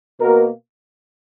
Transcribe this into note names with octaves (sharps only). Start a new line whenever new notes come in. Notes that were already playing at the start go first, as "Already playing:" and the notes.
B2 A#3 F#4 A#4